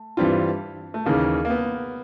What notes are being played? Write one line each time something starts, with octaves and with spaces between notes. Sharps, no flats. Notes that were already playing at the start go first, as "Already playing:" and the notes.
Already playing: A3
G2 E3 G3 C4 F4
A3
D#2 C#3 E3 A#3
A#3
B3